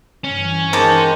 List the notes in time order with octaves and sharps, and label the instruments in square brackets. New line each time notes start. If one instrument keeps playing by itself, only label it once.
[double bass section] G2 E3 [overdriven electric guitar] C#4
[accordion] D#3 G#3 C5 [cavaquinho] D#4 A5 D6